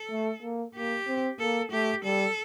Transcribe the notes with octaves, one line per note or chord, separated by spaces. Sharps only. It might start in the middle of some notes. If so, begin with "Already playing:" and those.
Already playing: A4
A3
A#3
A#3 G4
C4
A#3 A4
A3 G4
G3 A4